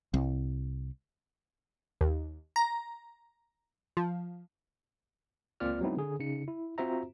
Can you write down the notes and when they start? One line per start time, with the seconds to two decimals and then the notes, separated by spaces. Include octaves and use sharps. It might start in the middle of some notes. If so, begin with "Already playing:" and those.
0.14 C2
2.01 D#2
2.56 A#5
3.97 F3
5.60 C#2 A#3 C4 F4 D5 F6
5.81 F#3 G#3 B3 C4 D#4 E4
5.97 D3 G#4
6.20 C#3 D#4 C#7
6.48 E4
6.78 C4 F4 F#4 C5 E5 A#5